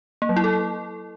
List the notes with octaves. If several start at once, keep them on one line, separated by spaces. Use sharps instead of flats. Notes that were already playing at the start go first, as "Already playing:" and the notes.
A#3
F#3
E4
A4